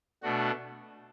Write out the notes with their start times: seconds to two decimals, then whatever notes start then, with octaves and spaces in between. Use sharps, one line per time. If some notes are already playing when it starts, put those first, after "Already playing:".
0.23 B2 A3 D4 F#4